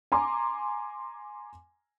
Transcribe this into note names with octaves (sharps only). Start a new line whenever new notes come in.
G#5 A#5 C6 D6